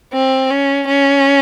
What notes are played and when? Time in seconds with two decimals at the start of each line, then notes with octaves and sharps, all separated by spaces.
0.13 C4
0.50 C#4
0.88 C#4